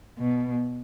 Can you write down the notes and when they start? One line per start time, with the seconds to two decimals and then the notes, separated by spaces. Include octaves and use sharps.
0.19 B2